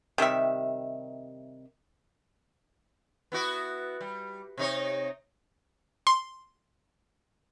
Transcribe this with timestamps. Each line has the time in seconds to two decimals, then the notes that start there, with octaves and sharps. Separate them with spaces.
0.18 C3 D#3 G3 E5
3.32 B3 E4 F#4
4.01 G3
4.58 C3 D#4 C#5
6.07 C6